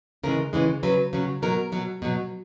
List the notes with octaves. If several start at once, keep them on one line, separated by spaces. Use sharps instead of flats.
C#3 E3 G#3 A#4
C#3 E3 G#3
C#3 F#3 B4
C#3 F#3
B2 F#3 A#4
B2 F#3
B2 F#3